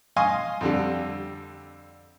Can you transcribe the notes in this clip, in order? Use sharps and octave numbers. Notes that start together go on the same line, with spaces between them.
D#5 F5 G#5 C6 C#6 D#6
F2 D3 G3